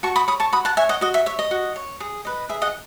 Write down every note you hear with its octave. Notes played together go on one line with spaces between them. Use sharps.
F#4 A5 C#6
B5 D#6
C#5 B5 D#6
A5 C#6
F#4 B5 D#6
F#5 A5
C#5 E5 G#5
D#5 F#5
F#4 D#5
E5
C#5 E5
D#5
F#4
C#5
G#4
B4 D#5
G#4 E5
D#5 F#5